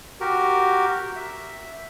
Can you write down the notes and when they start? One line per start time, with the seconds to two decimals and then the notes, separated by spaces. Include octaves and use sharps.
0.21 F#4 G4 A#4
1.16 E5